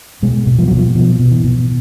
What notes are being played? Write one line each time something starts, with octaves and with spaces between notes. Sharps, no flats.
B2 G#3
B2
F3
F#3
B2
F3
B2 F3
B2
E3
B2